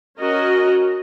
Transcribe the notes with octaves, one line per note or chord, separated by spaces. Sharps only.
C#4 F#4 A#4 D#5